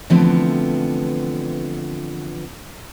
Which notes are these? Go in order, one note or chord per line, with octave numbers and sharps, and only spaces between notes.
D3 E3 F3 A3 B3 C4